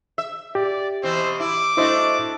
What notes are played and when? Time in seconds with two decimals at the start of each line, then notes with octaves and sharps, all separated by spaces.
0.18 E5
0.55 G4 D5
1.03 B2 E3 C4 C5
1.40 E4 D6
1.77 A3 D4 E4 F#4 C5 D#5